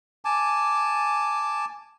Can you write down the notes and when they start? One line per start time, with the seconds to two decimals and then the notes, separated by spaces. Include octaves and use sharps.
0.25 G#5 A5 D6